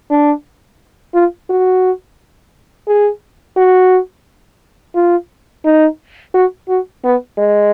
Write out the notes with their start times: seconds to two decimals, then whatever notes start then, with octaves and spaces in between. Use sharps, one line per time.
0.10 D4
1.14 F4
1.50 F#4
2.88 G#4
3.57 F#4
4.95 F4
5.64 D#4
6.34 F#4
6.68 F#4
7.04 B3
7.38 G#3